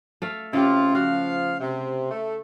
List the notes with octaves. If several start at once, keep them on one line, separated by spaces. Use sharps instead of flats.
A3 A4 F5
C#3 C4 E4 F4 G4
F3 F#4 F5
C3
A3